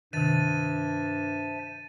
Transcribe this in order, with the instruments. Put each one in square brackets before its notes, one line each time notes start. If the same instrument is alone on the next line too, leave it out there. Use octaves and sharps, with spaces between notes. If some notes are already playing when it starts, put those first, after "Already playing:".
[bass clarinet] G2 [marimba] C3 D#3 [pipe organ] C5 E5 A5 [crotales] A6 D#7